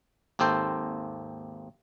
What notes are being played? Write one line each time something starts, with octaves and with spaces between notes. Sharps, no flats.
G#1 D#2 C4 A4 C5 G5